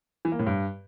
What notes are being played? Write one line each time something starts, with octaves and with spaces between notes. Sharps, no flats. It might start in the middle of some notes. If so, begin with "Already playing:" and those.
E3
A#3
A2
G2